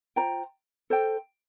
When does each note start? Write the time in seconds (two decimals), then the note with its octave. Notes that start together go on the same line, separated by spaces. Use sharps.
0.16 F4 C5 G5 A#5
0.90 A4 C5 G5